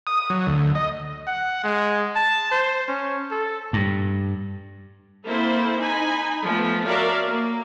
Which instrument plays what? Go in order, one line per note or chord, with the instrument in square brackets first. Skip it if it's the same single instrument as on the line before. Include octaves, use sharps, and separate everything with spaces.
[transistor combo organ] D#6
F#3
D2
D#5
[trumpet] F#5
G#3
A5
C5
C#4
A4
[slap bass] G2
[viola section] A#3 C4 E4 A4 C5
D#4 G#5 B5
F3 A3 B3
F#4 A#4 C#5 D5 E5 F5
A#3